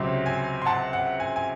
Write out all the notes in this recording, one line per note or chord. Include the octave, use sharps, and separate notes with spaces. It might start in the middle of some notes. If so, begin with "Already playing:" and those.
Already playing: C#2 C3 F#3 C4
G#5
C6
F#5 A5
F#5
G#5
G#5